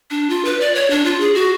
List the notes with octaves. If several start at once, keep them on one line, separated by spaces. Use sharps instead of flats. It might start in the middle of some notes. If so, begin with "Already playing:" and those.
D4
F4
B4
D5
C#5
D4
F4
G#4
F#4